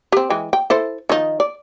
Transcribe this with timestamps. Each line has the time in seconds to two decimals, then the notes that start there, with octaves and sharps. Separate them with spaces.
0.12 C4 G4
0.30 E3 G#3 G5
0.53 G5
0.70 E4 A4 C5
1.09 D#3 F3 D#4
1.40 D5